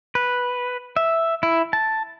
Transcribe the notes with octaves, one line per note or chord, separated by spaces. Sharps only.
B4
E5
E4
A5